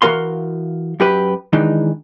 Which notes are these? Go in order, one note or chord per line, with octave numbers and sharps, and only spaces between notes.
E3 F#4 A#4 F5 C6
F#2 G4 B4
D#3 E3 G#3 D4 D#4